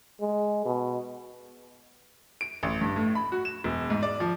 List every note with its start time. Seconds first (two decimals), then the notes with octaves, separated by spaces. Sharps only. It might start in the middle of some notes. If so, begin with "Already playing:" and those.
0.20 G#3
0.65 B2
2.41 D7
2.63 A1
2.81 G2
2.96 A2
3.15 B5
3.32 F#4
3.45 E7
3.64 E1
3.90 G#2
4.03 D5
4.20 F3